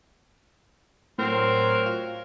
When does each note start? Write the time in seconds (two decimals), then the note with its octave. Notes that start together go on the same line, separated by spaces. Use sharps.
1.18 A2 F#3 C4 A#4
1.86 F4